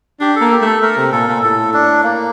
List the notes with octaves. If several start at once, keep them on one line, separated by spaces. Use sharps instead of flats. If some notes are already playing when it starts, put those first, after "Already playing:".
D4 G4
A4
A#3
G4
A3 A4
A3 A#4
C3
A#2 A4
A#2
A2 A4
D4
A#3